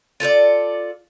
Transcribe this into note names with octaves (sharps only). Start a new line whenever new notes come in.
F4 A4 C5 D5